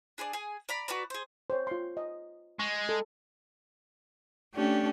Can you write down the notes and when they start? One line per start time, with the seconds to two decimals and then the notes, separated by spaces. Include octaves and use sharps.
0.18 D4 G#4 C5 D5
0.33 G#4 G#5
0.69 D5 A#5 B5
0.88 F#4 B4 D5 A#5
1.10 G#4 C5
1.50 C5 C#5
1.67 F4 C6
1.97 D#5
2.59 G#3 C#6
2.89 A4
4.54 A3 C#4 D4 G4